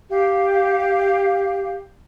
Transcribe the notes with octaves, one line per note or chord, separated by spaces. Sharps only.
G4 F5